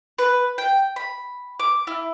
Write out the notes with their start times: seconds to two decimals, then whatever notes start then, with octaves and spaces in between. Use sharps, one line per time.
0.18 B4
0.58 G5
0.96 B5
1.60 D6
1.87 E4